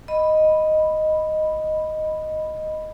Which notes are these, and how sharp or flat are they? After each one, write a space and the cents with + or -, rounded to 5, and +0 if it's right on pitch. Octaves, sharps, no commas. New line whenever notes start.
D#5 +0 B5 +0